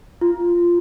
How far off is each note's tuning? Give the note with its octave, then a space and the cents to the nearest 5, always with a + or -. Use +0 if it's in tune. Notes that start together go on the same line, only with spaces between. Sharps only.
F4 -10